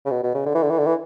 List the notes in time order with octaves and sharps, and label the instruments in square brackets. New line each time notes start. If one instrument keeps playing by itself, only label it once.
[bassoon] C#3
B2
B2
C#3
D3
E3
D3
E3
D3
E3